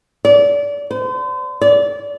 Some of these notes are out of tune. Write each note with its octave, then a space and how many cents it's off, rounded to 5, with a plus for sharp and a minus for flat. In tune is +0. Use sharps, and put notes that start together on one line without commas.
D5 -30
C5 -40
D5 -25